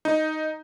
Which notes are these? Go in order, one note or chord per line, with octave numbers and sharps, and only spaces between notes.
D#4